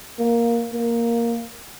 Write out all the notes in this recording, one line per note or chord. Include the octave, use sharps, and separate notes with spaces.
A#3
A#3